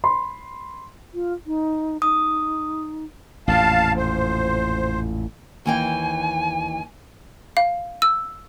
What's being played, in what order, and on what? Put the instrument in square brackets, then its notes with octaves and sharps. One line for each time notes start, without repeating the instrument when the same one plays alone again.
[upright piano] B5 C6
[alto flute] F4
D#4
[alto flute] D#4 [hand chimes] D#6
[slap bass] A1 F2 A#2 [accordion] F5 A5
[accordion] C5
[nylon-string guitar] D#2 E3 G5 [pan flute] G#5
[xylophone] F5
E6